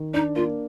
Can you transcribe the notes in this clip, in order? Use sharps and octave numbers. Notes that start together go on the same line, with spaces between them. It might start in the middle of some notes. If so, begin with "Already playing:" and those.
Already playing: D#3
D4 D#4
A#3 F4